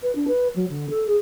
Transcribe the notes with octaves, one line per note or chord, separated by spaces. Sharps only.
B4
D4
B4
F#3
D3
A4
G#4